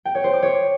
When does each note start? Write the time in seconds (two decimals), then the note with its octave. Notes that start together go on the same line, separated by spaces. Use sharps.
0.05 G5
0.15 C#5
0.24 C5
0.33 D6
0.42 C#5